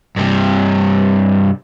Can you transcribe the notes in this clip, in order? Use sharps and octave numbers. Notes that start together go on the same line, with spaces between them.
G2 C3